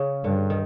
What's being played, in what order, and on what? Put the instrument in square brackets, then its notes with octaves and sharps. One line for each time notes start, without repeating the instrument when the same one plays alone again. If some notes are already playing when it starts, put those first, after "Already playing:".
Already playing: [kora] C#3
[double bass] G2 [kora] D3
[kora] D#3